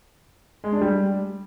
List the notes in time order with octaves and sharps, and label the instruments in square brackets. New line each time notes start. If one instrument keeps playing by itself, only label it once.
[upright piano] G#3
D4
G3